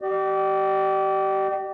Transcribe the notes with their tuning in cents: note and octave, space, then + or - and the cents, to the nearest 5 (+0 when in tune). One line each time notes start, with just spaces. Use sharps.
G4 -30 D5 +45